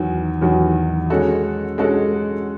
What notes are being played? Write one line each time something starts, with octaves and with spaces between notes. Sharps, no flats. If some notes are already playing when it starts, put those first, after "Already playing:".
Already playing: E2 D#3 F#3
E2 D#3 F#3
G#3 C#4 F#4 A4
G#3 C#4 F#4 A4